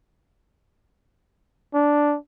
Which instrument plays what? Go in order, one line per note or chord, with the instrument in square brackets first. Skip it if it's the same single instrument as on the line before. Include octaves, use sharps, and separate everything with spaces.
[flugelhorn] D4